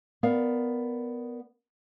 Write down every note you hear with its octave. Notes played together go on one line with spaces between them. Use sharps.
B3 A#4 D5 F5